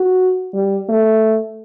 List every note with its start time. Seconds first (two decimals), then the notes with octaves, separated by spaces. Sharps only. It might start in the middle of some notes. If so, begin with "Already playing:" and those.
Already playing: F#4
0.53 G3
0.89 A3